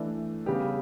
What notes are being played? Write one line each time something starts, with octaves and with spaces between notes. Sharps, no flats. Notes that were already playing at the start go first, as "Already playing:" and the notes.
Already playing: E3 A3 D4
C#3 G3 B3 D4 G4